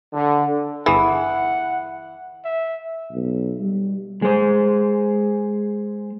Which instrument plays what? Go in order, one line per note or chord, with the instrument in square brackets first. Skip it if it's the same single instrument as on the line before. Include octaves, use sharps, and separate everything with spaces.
[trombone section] D3
[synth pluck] G1 G#4 [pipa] E3 [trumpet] F#5
[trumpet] E5
[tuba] B1
G3
[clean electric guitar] G#3 C5